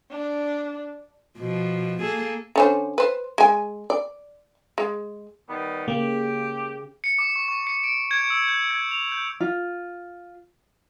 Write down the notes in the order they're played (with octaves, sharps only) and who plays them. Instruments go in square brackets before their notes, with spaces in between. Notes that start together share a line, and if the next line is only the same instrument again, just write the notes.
[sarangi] D4
[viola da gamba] B2 F3
A#3 G#4 A4
[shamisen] D3 C#4 C5
B4 C5
G#3 G#5
D5
G#3
[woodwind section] D#3 G3 B3
[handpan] C#3 [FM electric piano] A#3 [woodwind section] G4
[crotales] C#7
D6
C#6
C#6
C#7
D7
G#6
E6
G6
G#6
F7
G6
[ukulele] F4